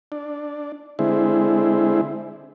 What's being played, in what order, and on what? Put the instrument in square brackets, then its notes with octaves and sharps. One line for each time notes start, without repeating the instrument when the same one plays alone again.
[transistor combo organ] D4
D3 G#3 C4 E4